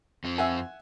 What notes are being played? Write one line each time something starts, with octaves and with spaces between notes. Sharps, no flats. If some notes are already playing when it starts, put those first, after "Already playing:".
F2 C4
E5 F#5 G#5